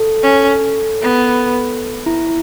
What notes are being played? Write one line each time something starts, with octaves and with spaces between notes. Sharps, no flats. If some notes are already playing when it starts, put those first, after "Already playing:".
Already playing: A4
C#4
B3
E4